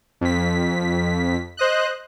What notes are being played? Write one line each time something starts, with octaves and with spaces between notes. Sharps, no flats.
F2 B6
C5 D#5 F#6